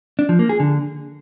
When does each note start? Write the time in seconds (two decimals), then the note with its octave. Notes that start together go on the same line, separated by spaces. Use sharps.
0.19 D4
0.29 F3
0.39 A#3
0.49 G#4
0.60 D3